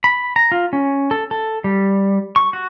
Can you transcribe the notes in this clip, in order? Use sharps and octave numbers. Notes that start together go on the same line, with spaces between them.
B5
A#5
F4
C#4
A4
A4
G3
C#6
F#4